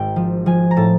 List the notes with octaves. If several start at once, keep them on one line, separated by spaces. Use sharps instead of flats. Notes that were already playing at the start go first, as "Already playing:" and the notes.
Already playing: G#1 G#2 G5
F3
F3 G#5
A#5
A2 A5